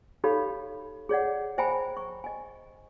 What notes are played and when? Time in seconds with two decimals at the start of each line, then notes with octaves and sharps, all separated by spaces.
0.24 D#4 G4 A4 C#5 F5 B5
1.09 G#4 C#5 D5 F#5
1.58 C5 E5 G5 G#5 A#5 B5
1.97 C#6
2.24 D#5 G#5